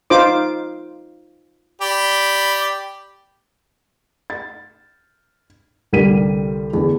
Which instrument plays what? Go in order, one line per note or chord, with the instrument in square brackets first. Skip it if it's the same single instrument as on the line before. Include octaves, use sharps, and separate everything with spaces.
[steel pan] D#4 F4 C5 D6
[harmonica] G4 D5 B5
[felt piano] A6
C2 D3 G3 A#4 B6 D#7
E2 D3